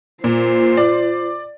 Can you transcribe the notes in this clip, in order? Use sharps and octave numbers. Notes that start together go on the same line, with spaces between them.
A#2 F4 C5
D5